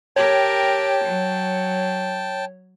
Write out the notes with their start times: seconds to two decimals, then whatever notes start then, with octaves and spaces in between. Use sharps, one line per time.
0.16 G4 A#4 C#5 G5 A5
1.04 F#3